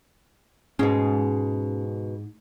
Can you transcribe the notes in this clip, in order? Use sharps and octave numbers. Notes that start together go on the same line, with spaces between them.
G#2 B2 C#4 D#4 G#4